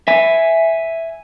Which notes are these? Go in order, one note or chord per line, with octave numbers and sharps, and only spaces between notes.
E5 G#5